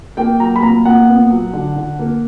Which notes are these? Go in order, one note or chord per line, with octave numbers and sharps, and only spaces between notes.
A#3 G5
F#3 A#5
B5
A#2 A#5
A#2 F#5
B3
F#3
D3
D3
A#3